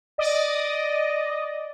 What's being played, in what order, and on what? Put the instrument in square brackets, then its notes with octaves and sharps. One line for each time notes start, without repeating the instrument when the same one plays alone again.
[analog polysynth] D5 D#5